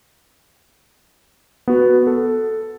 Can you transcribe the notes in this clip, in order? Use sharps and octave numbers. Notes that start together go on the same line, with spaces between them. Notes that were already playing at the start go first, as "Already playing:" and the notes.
B3 F#4
A4